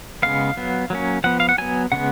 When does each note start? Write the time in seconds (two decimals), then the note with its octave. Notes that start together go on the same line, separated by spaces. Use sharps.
0.22 C#3 G#3 B3 F5
0.57 F#3 B3
0.90 F#3 A#3 C#4
1.24 F3 B3 F#5
1.40 F5
1.49 F#5
1.58 F#3 B3 G#5
1.92 C#3 G#3 B3 F#5